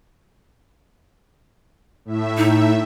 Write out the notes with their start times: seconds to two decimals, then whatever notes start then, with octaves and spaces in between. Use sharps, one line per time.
2.05 A2 E5
2.37 D#4